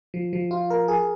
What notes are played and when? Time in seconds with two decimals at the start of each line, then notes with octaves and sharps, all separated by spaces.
0.14 F3
0.33 F3
0.51 F4
0.70 A#4
0.88 G#4